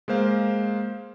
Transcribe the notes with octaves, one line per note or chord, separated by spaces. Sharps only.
G#3 A#3 C5 F5